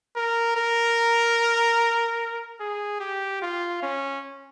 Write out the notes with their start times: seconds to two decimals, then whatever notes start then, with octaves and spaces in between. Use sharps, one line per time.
0.16 A#4
0.57 A#4
2.60 G#4
3.00 G4
3.42 F4
3.83 C#4